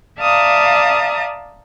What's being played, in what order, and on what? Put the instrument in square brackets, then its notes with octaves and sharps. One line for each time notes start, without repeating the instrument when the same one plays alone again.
[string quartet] D5 E5 F5 A5 A#5 D#6